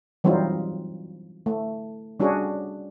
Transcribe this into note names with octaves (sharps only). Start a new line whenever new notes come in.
E3 F#3 G3 C4 D#4 F4
A3
G3 C#4 D4 F#4 G#4